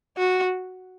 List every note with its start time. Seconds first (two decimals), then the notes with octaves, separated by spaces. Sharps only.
0.17 F#4